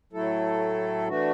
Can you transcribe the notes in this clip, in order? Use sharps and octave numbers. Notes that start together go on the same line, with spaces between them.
A2 F#3 A3 E4 A4
E3 A3 D4 F#4